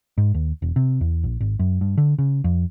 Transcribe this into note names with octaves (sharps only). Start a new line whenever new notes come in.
G#2
D#2
E1
C3
E2
A#1
G#1
F#2
G2
D3
C#3
F2